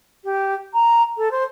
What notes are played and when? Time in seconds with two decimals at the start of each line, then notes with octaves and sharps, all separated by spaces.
0.24 G4
0.74 A#5
1.17 A4
1.31 C5